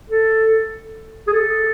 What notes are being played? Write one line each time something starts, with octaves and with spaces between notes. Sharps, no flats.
A4
G#4
A4